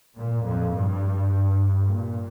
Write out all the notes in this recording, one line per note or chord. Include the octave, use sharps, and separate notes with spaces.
A#2
F2
G2
A#2